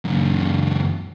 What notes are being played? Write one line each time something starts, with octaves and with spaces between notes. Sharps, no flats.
C#2 F#2